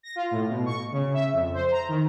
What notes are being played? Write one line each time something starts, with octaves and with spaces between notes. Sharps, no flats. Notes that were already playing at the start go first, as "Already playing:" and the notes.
A#6
F4
A2
B2
C#6
C#3
E5
F2
C5
A#5
D#3